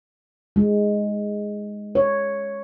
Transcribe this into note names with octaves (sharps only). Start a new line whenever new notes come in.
G#3
C#5